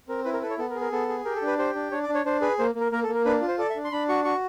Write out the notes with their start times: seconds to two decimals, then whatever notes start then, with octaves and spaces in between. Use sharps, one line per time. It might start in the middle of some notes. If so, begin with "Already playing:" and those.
0.08 C4 A#4
0.25 E4 B4
0.33 A#4
0.42 A4 B4
0.50 C#5
0.58 B3 A4
0.70 A#4
0.75 G#4
0.81 A#4
0.92 B3 A4
1.09 G#4
1.25 G4 A#4
1.36 A4
1.42 D4 B4
1.58 G4 C5
1.75 D4
1.91 D4 C#5
2.03 D5
2.09 D4
2.15 C#5
2.25 D4 C5
2.41 G#4 B4
2.59 A#3 C5
2.75 A#3
2.80 A#4
2.92 A#3 A#4
3.04 A4
3.08 A#3
3.15 A#4
3.25 D4 B4
3.41 F4
3.48 C5
3.58 A4 D5
3.70 E5
3.76 D4
3.85 C6
3.92 D4 B5
4.09 F#4 C#6
4.25 F#4 C#6